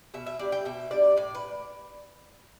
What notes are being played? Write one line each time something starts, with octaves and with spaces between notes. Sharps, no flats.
B2 E5
E5
G3 D4 D5
G5
B2 E5
G3 D4 D5
A2 D5
B4